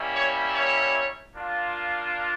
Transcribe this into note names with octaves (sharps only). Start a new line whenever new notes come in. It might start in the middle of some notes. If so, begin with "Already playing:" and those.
Already playing: G3 A#3 C#4 E4
C#5
C#5
A#3 D4 F4